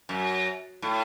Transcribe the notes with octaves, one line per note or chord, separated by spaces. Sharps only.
F#2
A2